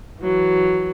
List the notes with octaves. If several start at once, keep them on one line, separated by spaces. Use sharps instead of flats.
E3 F#3